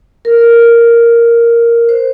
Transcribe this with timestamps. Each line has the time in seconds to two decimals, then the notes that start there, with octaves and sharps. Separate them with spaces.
0.25 A#4
1.89 C5